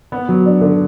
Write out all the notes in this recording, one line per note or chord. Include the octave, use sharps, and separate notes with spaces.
B3
F#3
D4
D3